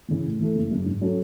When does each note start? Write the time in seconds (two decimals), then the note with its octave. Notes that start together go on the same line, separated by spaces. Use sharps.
0.08 C#3 E3
0.25 A2
0.39 E3 A3 E4 A4
0.55 F#1
0.71 F#2 C#3
0.86 G#2
1.01 F#3 C#4 F#4 A4